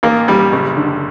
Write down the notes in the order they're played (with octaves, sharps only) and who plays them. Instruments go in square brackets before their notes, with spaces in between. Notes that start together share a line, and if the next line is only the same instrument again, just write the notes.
[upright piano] A1 [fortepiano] A#3
[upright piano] A1 [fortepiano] G3
[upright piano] F#1
D3